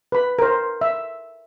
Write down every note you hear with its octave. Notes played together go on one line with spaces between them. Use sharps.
B4 B5
A#4 C5
E5